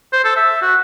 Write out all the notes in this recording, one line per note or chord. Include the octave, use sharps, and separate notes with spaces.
C5
A4
E5
F#4